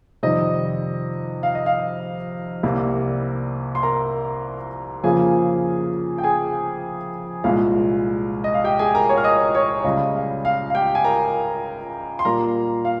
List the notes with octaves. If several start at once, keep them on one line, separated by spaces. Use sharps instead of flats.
F2 C3 D#3 G3 D#5
F5
D#5
F5
C2 C3 G3 A#3
C6
A#4 A#5
F2 C#3 F3 A#3 G#4 G#5
G5
G#4 G#5
C2 A#2 G#3 F5
D#5
F5
G4 G5
G#4 G#5
A#4 A#5
C#5 C#6
F6
D#5 D#6
C#5 C#6
C#2 C#3 G3 D#5
F5
F5
F5
G4 G5
G#5
A#4 A#5
C6
A#2 G3 A#3 A#4 A#5
F5